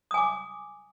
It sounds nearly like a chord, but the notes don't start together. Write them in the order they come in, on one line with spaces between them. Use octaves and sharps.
D#6 G#5 D6